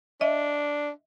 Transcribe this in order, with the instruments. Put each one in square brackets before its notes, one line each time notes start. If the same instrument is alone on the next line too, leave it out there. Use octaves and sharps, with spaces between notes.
[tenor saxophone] D4 [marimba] D#5 E5